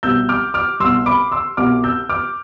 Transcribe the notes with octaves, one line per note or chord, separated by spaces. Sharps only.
C2 B2 G3 E6 G6
D6 F6
D6 F6
C2 B2 G3 C6 E6
B5 D6
C6 E6
C2 B2 G3 D6 F6
E6 G6
D6 F6